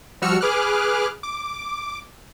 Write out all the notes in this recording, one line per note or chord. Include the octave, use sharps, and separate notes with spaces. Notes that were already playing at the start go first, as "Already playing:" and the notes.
F3 G3 F#4 E6 F6 C#7
G#4 B4 D6 F6 F#6
D6